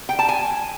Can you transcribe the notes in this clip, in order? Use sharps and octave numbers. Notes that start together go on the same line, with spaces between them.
G5
A5
G#5